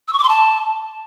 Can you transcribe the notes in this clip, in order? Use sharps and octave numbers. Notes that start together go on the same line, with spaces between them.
E6
C#6
D6
C6
A5